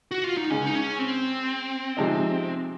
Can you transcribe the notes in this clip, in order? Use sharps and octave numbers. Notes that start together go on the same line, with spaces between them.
F#4
F4
D#4
C#2 C#3 G#3 C#4
D#4
C#4
C4
C3 F3 G#3 D#4